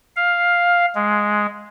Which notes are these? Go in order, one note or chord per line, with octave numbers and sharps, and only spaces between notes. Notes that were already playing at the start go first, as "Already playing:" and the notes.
F5
G#3